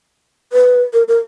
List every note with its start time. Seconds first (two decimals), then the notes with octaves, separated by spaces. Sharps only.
0.53 B4
0.93 A#4
1.08 A#4